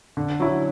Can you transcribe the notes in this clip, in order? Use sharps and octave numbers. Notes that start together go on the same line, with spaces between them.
D3
F#3 C#4 E4